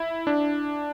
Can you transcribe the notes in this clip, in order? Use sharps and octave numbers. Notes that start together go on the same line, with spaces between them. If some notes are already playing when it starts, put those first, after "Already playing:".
Already playing: E4
D4